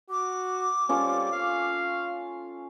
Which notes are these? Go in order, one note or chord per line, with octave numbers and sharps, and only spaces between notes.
F#4 D6
G3 C#4 F4 A4
F5